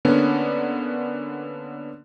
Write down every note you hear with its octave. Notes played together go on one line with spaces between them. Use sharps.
D3 A#3 B3 C#4 D4